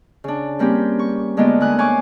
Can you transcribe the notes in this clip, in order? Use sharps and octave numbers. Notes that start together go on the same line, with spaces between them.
C#3 D4
G3 A#3 C4 C#4 G4
C#6
D3 G#3 A#3 B3 F4 D5
D2 G#5 D#6 F#6
C#5 F5 G#5 C#6 D6